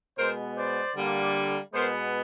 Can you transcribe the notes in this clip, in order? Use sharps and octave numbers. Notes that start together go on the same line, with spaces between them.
B2 G#3 B3 A#4 C5
C5 D5
D3 G3 A#3
B2 G#3 B3 A#4 C5